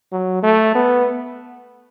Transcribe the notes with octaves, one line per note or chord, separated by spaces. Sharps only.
F#3
A3
B3